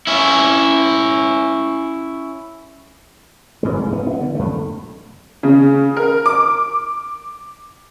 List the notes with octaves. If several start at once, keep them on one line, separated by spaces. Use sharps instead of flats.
C#4 E4
F#1 G#2 G#3
F1
B3
B3 D4
D3
F2 A3
C#3
A#4
D6